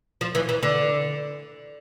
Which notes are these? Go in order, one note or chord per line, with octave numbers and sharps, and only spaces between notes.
F3
E3
E3
D3